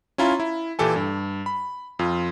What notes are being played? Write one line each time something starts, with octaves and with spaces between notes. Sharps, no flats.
C#4 E4 F4 A#5
E4
A#2 E3 G4 A4 G#5
G2
B5
F2 F4